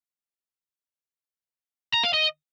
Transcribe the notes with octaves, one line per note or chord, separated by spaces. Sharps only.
A#5
F5
D#5